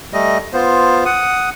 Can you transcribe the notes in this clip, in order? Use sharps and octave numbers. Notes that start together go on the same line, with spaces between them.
G3 A3 D#5
B3 F4 C5
F#5 D#6